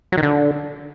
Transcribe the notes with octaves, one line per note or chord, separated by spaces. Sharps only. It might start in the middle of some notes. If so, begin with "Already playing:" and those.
F#3
D#3
D3